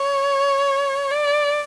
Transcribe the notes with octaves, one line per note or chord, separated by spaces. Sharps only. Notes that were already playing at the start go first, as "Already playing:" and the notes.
Already playing: C#5
D5